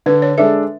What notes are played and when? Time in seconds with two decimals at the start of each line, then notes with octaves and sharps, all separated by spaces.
0.06 D3 B4
0.22 C#5
0.38 G#3 D4 A4 E5